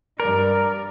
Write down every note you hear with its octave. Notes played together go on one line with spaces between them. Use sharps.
G2 A#4 D5